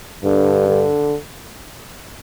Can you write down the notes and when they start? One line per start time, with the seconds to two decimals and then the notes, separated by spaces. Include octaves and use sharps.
0.24 G2 D3
0.68 D3